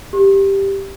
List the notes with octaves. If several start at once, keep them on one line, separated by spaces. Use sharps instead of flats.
G4